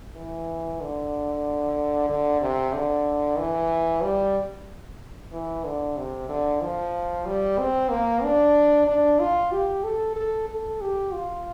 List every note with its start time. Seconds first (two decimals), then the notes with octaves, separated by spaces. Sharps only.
0.16 E3
0.80 D3
2.09 D3
2.41 C3
2.74 D3
3.38 E3
4.03 G3
5.32 E3
5.64 D3
5.97 C3
6.29 D3
6.61 F3
7.26 G3
7.59 C4
7.90 A#3
8.23 D4
8.87 D4
9.19 F4
9.52 G4
9.84 A4
10.16 A4
10.49 A4
10.81 G4
11.13 F4